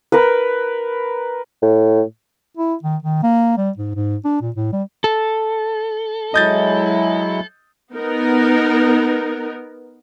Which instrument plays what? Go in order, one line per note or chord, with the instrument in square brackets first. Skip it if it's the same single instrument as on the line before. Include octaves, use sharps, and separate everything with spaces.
[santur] A#4 B4
[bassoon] A2
[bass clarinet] E4
D#3
D#3
A#3
G3
G#2
G#2
D4
A#2
A2
G3
[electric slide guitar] A4
[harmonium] F#3 G#3 E4 [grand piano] D#5 G6 A6
[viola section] B3 D#4 A#4